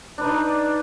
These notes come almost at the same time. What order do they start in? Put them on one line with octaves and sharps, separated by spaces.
D4 B4 D#4 D5